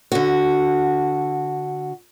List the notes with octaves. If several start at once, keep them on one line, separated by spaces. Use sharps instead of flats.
D3 F#4